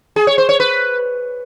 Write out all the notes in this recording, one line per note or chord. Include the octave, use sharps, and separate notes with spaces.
G#4
C#5
C5
C#5
B4